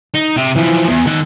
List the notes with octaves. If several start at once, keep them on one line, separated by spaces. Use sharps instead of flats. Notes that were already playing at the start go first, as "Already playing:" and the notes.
D#4
C3
E3 F3
E2
D#3 F#5